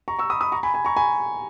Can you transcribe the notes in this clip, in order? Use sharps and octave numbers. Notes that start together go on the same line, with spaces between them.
A#5 C#6
C#6 E6
B5 D#6
B5 D#6
A#5 C#6
G#5 B5
G#5 B5
A#5 C#6
G#5 B5